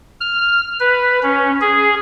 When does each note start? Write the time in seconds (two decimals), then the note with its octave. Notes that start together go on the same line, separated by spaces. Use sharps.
0.20 F6
0.80 B4
1.23 C#4
1.61 G#4